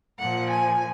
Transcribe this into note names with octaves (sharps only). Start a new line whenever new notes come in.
A#2 F3 F#5
G#5